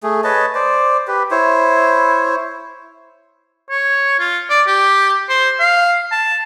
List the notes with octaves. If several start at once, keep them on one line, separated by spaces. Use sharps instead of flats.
A3 G#4
B4 C#5 D#5 A5
C5 D5
G4 B4
E4 C5 C#5
C#5
F4
D5
G4
C5
F5
A5